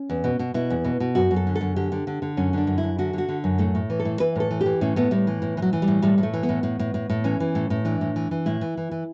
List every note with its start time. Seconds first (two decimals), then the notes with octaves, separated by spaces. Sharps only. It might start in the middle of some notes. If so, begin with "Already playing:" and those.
Already playing: C#4
0.10 E2
0.24 B2
0.39 B2
0.54 B2 E4
0.70 E2
0.84 B2
1.00 B2
1.15 F#2 F#4
1.31 F#2
1.36 A4
1.47 D3
1.56 A4
1.61 F#2
1.76 D3 G4
1.92 D3
2.07 D3
2.22 D3
2.37 F#2 C#4
2.53 D3 D4
2.67 F#2
2.78 E4
2.83 F#2
2.98 D3 F#4
3.13 D3 F#4
3.29 D3
3.44 F#2
3.58 A2 A3
3.75 A2
3.90 E3
3.99 A4
4.05 A2
4.20 E3 B4
4.36 A2 A4
4.51 E3
4.61 G4
4.66 E3
4.81 A2 C#4
4.96 A2 B3
5.11 A2 G3
5.27 E3
5.42 A2
5.57 E3
5.62 F#3
5.73 E3
5.82 G3
5.88 A2
6.02 A2 G3
6.18 A2
6.23 A3
6.34 E3
6.43 B3
6.49 A2
6.63 A2
6.79 A2
6.94 A2
7.10 A2
7.24 E3 C#4
7.40 E3
7.55 A2
7.70 A2
7.85 E3 D4
8.01 A2
8.16 E3
8.31 E3
8.46 A2 E4
8.61 E3
8.77 E3
8.91 E3